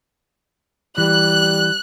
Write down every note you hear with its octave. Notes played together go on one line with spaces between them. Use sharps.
E3 G3 F#6